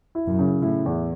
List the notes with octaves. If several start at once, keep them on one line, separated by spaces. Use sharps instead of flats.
E4
F#2
C#3
A2 E4
E2